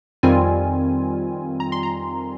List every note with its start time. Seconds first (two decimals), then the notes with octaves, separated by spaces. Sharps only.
0.23 F2 D#3 G3 C4 F4 G#5
1.60 A#5
1.72 C6
1.83 A#5